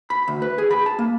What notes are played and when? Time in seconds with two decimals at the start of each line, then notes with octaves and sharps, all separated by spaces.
0.10 B5
0.28 D2
0.42 B4
0.58 G#4
0.71 B5
0.86 A5
0.99 A#3